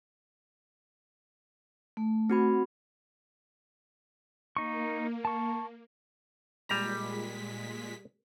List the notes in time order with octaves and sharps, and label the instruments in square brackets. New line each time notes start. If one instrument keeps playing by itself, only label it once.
[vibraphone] A3
[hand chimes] C4 F#4 B5
[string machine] A#3 [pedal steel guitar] D#4 C#6
[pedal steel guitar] A5 C#6
[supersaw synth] A#2 G#3 B6 [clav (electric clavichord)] G3 A#5